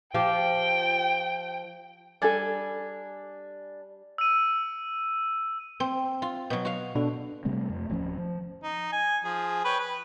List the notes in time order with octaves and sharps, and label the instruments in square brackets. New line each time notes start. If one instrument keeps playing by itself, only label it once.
[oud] F3 G4 [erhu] G5
[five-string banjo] G3 A4 [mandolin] D4 G#5
[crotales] E6 D#7
[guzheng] C4
F4
B2 F#3
F#4 F5
[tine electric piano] B2 D4 A4
[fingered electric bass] C3 G3 A3 C4
F2 A3
D1 F3 C#4
F3
[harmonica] D#4
G#5
F3 G#4
B4 C#5 G5
B4